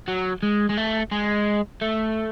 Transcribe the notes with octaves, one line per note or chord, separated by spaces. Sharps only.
F#3
G#3
G#3
A3
G#3
A3